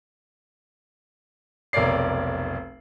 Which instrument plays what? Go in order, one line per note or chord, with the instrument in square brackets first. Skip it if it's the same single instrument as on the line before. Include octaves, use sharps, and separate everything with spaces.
[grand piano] F1 B1 A#4 C#5 D5 C7